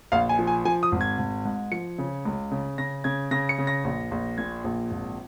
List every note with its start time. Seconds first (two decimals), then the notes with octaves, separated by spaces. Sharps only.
0.12 A#1 F5
0.29 G#5
0.39 F3
0.47 G#5
0.65 F3 G#5
0.83 D#6
0.92 G#1
1.01 G#6
1.18 G#1
1.45 G#2
1.72 F3 C#7
1.98 C#3
2.25 C#2
2.51 C#3
2.78 C#3 A#6
3.04 C#3 G#6
3.31 C#3 A#6
3.49 C#7
3.58 C#3
3.67 A#6
3.84 A#1
4.11 A#1
4.38 A#2 G#6
4.64 A#1
4.91 G#1